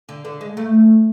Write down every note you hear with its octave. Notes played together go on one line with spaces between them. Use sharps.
D3
D3
G#3
A3